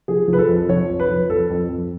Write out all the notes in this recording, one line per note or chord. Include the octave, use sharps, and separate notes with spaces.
F3 G#4
F3
B4
A4
F2
F3 C#5
F2
B4
F3
F2 A4
F2
F2